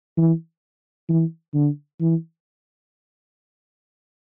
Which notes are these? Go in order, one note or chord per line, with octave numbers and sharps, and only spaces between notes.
E3
E3
D3
E3